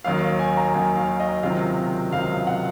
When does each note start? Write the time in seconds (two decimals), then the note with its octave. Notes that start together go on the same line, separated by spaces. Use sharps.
0.04 D#2 D#3 F#3 F5
0.39 G#5
0.57 A#5
0.74 D#2 D#3 F#3 G#5
0.97 F5
1.20 D#5
1.43 C#2 C3 D#3 F#3 C4 F5
2.12 C#2 C3 D#3 F#3 C4 F5
2.47 F#5